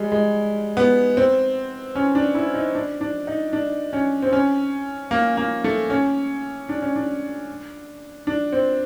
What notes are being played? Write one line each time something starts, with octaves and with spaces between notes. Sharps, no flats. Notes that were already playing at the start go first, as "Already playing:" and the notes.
Already playing: G3 G#3
G#3
B3
C4
C#4
D4
E4
D#4
D4
D4
D#4
D4
C#4
C4
C#4
A#3
A#3
A3
C#4
D4
C#4
D4
D4
C4